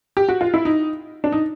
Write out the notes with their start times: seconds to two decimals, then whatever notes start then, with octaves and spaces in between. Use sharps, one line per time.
0.17 G4
0.29 F#4
0.41 F4
0.54 E4
0.65 D#4
1.24 D4
1.32 D#4